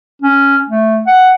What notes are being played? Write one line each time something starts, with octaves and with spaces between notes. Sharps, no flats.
C#4
A3
F#5